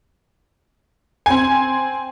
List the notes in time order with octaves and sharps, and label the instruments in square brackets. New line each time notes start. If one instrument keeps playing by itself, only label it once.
[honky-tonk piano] C4 G#5